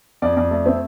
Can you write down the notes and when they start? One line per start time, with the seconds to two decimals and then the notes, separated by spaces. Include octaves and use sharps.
0.22 F2 D5
0.37 F2 D5
0.51 A3 D5
0.66 C4 E5